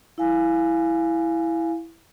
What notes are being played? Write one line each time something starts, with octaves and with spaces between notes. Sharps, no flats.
E4 F5 G#5